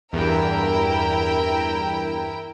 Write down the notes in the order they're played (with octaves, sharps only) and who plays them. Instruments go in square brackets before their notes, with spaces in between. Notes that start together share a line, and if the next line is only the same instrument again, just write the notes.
[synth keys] E2 G2 [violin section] E4 A#4 G5